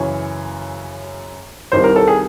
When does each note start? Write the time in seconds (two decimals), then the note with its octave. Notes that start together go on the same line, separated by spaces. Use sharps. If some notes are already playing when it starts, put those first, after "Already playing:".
Already playing: F#2 C#3 E3 C#5
1.72 C2 C3 D#3 C5
1.84 A#4
1.96 A4
2.08 G#4